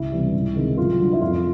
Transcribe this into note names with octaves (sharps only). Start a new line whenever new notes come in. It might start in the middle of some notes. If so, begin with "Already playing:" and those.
Already playing: C#2 E4
C3 E3 G3
C#2
C3 D#3 G#3
F#2 F4
D3 F#3
E4
F2 F4